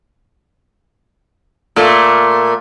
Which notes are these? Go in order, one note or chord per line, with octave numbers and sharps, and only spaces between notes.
A#2 A3